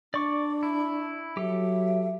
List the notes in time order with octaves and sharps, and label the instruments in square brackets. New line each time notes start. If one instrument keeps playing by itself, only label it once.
[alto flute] D4 [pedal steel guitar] D5 C#6 D6
[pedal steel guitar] E4
[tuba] F#3 [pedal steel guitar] G4 A4 [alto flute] E5